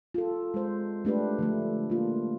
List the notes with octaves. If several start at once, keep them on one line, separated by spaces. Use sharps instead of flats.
F4 A4
G#3 C5
A3 D4 G4 B4
D3 F3 A3
A#3 F4